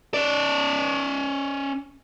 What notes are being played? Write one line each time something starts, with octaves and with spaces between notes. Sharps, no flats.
C#4 D5